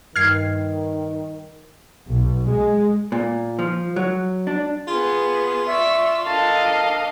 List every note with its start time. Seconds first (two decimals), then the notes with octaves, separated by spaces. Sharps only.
0.16 G2 D#3 F6 G#6 C7
2.08 B1
2.49 G#3
3.12 A#2
3.59 F3
3.96 F#3
4.47 D4
4.88 B3 F4 G#4
5.67 D5 E5 C#6 E6
6.26 D4 A4 A#4 D#5 F5 A5